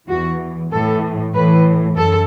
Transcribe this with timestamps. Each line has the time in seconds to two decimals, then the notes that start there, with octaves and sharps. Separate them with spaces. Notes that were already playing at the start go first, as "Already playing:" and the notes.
0.08 E2 E3 F#4
0.71 A2 E3 A4
1.34 A2 E3 B4
1.96 F#2 A4